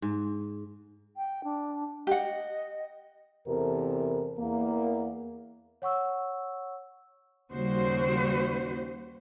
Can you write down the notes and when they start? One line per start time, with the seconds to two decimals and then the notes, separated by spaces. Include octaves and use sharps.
0.02 G#2
1.17 G5
1.44 D4
2.07 G4 D#5 F#5
3.46 E2 C3 A4 A#4
4.39 E2 A#3
5.82 C#5 F#5 C#6 E6
7.52 D#2 C#3 G3 F#4 C5